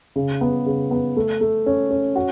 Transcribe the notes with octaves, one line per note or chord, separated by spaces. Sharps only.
C#3
B3
C#3
B3
A3
A3
C#4
C#4
F#4